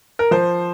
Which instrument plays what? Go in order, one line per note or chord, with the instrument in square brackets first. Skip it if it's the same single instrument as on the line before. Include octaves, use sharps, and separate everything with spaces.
[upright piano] A#4
F3 C5